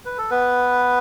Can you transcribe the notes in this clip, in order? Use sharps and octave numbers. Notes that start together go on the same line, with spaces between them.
B4
A4
B3 B4